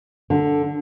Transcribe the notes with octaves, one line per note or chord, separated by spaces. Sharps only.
D3